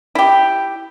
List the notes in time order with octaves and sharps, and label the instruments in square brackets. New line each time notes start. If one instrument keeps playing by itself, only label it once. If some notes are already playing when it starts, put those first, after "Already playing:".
[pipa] E4 G4